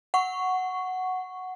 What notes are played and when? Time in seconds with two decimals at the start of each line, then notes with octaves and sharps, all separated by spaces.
0.14 F#5 C#6